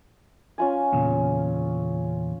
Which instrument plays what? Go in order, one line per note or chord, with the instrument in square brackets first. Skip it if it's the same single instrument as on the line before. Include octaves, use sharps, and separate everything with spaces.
[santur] C#4 F4 G#5
[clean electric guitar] E2 A#2 C#3